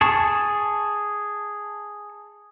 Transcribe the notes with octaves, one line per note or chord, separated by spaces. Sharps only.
G#4 A5 C#6